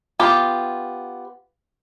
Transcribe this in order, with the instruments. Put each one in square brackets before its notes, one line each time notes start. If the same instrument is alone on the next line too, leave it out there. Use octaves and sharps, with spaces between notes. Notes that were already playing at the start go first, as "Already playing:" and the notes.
[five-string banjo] B3 F4 G4